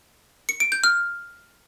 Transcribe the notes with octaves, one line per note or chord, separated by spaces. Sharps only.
C#7
D7
G6
F6